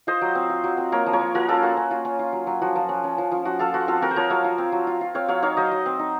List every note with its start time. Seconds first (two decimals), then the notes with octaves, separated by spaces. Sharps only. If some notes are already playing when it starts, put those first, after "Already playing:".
0.07 F4 C5 D#5
0.22 F#3
0.35 C4
0.50 F4
0.64 F#3
0.78 C4
0.92 A#3 A#4 C#5
1.06 F3
1.13 A#4 C#5
1.21 F3
1.35 F3 F#4 A#4
1.48 C#4 F4 A4
1.62 A#3 F#4
1.77 C#4
1.91 F4
2.05 C#4
2.19 F4
2.33 F#3
2.47 F#3
2.62 F3 F#4
2.76 F3
2.89 C#4
3.04 C#4
3.18 F3
3.32 F3
3.45 F3 F#4
3.59 F3 F4 A4
3.74 F3 F#4
3.88 C4 F4 A4
4.02 C4 F#4 A#4
4.11 C5
4.16 F3 A#4 C#5
4.30 F#3 C#5 F5
4.44 F4
4.58 C4
4.72 F#3
4.87 F4
5.01 F4
5.15 C4 C#5 F5
5.28 F#3 C#5 F5
5.42 D#4 C#5 F5
5.57 F#3 C5 D#5
5.72 F#3
5.86 C4
5.99 D#4